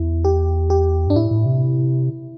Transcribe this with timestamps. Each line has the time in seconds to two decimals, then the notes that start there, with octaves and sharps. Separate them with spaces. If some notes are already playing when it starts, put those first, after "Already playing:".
Already playing: E2 E4
0.25 G4
0.70 G4
1.07 G2
1.10 D4
1.16 A2 E4
1.31 A2
1.46 C3